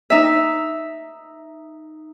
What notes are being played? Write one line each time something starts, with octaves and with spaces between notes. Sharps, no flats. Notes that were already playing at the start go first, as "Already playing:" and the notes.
D#4 E5